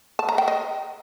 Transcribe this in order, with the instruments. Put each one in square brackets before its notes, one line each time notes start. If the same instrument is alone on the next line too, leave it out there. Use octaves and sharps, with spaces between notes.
[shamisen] A5
A#5
G5
D#5